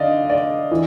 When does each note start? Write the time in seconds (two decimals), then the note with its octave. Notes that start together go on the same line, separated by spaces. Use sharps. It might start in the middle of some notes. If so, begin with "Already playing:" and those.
Already playing: D3 D5 D#5 F5
0.30 D5
0.71 E3